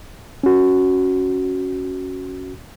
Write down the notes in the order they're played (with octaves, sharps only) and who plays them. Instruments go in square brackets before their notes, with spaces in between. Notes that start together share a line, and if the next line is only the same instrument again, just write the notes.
[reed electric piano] C#4 F#4